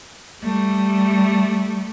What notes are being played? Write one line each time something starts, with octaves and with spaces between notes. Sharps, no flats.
G3 A3